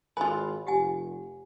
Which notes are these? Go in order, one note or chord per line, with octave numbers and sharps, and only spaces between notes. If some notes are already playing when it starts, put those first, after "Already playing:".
G#1 F4 B4 G#5 B5
F1 G4 F#5 G#5